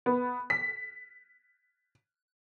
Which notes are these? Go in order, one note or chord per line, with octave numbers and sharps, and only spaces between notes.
B3
B6